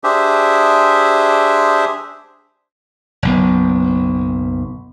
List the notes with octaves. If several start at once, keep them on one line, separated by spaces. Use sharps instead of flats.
D4 G4 G#4 C5 E5
F#1 B1 B3